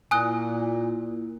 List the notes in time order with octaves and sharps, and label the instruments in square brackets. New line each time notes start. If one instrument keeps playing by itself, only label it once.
[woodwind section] A#2 [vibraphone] A#3 E4 A#4 [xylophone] G#5 D#6 F#6